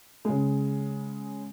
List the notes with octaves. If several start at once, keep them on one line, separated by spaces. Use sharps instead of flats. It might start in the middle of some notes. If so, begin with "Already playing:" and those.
C#3 G#3